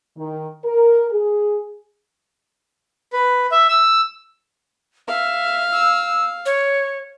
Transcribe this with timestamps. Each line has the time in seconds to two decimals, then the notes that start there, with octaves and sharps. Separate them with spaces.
0.17 D#3
0.65 A#4
1.11 G#4
3.13 B4
3.52 E5
3.69 E6
5.08 E5 F5
5.72 E6
6.46 C#5